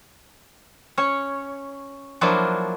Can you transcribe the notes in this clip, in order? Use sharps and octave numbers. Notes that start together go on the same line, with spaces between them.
C#4 C#5
F3 F#3 A#3 D4 E4 F4